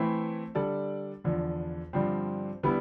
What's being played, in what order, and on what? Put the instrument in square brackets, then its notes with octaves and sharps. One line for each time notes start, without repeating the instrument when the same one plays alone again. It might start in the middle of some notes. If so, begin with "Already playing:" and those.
Already playing: [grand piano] E3 A3 C4 E4
D3 G3 D4 A4 D5
E2 D3 F3
G2 D3 F3 C4
D3 G3 B3 E4